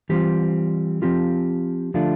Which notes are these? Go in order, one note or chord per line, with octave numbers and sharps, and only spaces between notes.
E3 G3 C4 F4 G4
F3 C4 F4 G4
D3 F3 A3 D4 F4